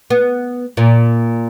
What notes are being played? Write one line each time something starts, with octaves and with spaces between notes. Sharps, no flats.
B3
A#2